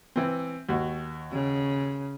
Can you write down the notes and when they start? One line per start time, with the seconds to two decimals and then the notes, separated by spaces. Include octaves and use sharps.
0.16 E3 C4
0.69 D#2 F#4
1.32 C#3